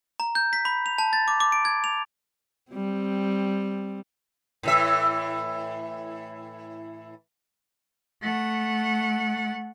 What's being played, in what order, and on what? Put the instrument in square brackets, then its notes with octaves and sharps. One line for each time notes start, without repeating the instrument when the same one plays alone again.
[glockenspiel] A#5
G6
B6
B5
F7
A5
A6
D6
D6
D7
G#6
F7
[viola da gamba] G3 C4
[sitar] A2 E3 E5
[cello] A3 F#5